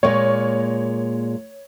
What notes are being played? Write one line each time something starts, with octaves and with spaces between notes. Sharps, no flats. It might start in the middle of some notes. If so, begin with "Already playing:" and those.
A#2 G#3 A#3 C#5